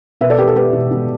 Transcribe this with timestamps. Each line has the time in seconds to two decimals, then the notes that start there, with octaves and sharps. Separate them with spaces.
0.21 B2 B4 E5
0.30 A4 D5
0.38 B3 G4 B4
0.47 A4
0.55 B3 G4 B4
0.73 B2
0.91 B2